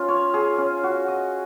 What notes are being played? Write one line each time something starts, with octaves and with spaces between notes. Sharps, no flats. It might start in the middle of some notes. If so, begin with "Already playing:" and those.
Already playing: C#4 F4
C#5
G#4
C#4
F#4
D#5